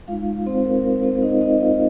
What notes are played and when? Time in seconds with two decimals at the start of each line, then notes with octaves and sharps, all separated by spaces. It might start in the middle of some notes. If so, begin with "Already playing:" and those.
0.08 G#3 F4 F5
0.11 D#4
0.46 C4 C5
0.65 A#4
0.84 A#4
1.03 C4 C5
1.23 D#4 D#5
1.41 D#4 D#5
1.60 F4 F5